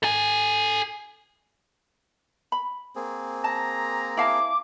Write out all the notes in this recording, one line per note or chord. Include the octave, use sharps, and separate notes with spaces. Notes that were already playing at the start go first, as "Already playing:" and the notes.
A4 G#5
B5
A#3 C4 G#4
A5 A#5
E4 F5 A5 D6